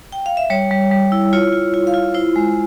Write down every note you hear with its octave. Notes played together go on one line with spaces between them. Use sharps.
G5
F5
E5
G3 C#5
G3
G3
E4
F4 C#5
F4
F4
F5
F4
E4 C5
G#3